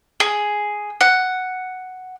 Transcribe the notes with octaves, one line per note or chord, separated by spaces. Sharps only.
G#4
F#5